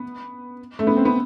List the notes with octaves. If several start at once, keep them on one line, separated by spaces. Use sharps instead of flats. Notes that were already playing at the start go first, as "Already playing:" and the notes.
Already playing: B3
A3
B3
C4
B3